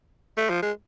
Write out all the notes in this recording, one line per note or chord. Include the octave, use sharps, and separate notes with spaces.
A3
F3
G#3